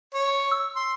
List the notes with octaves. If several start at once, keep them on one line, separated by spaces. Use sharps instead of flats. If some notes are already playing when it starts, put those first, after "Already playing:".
C#5
E6
C6